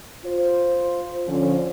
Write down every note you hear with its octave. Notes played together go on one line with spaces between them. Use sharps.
F4 C5
D3 F3 C#4